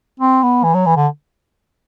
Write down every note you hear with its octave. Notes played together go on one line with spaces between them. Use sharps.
C4
B3
E3
F#3
E3
D3